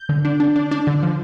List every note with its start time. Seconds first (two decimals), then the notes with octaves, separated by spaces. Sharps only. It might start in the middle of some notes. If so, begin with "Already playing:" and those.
Already playing: G6
0.09 D3
0.25 D4
0.40 D4
0.56 D4
0.71 D4
0.87 D3
1.03 F3